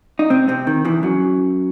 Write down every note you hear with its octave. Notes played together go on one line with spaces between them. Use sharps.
D#4
C3 C4
C3 C4
D#3
E2 E3
F#2 F#3